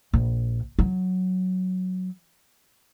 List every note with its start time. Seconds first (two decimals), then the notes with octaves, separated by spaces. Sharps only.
0.14 A#1
0.79 F#3